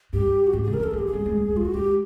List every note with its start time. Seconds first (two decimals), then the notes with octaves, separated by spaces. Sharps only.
0.13 G2 G4
0.47 F#4
0.53 G#2 G4
0.63 G#4
0.68 C#3
0.74 A#4
0.80 E3 A4
0.91 F3 G#4
0.99 G4
1.06 G#4
1.13 G3
1.26 G#3
1.37 G3
1.49 G#3
1.57 F4
1.61 G3 F#4
1.74 G#3 G4